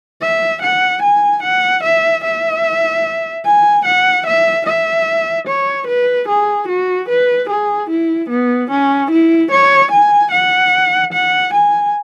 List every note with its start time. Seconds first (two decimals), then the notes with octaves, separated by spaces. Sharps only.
0.22 E5
0.62 F#5
1.02 G#5
1.43 F#5
1.83 E5
2.24 E5
3.45 G#5
3.85 F#5
4.26 E5
4.66 E5
5.47 C#5
5.87 B4
6.28 G#4
6.68 F#4
7.09 B4
7.49 G#4
7.90 E4
8.30 B3
8.70 C#4
9.11 E4
9.51 C#5
9.92 G#5
10.31 F#5
11.13 F#5
11.53 G#5